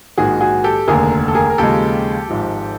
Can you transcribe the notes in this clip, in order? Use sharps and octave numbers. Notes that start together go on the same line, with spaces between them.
A#1 G#2 D#3 F#4 G#4
F#4 G#4
G4 A4
F1 D#2 D3 G#4 A#4
A4
G#4 A#4
A#4
D#2 C#3 F3 G#3 G4 A4
G#1 G#2 F3